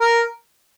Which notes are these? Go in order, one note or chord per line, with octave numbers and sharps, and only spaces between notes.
A#4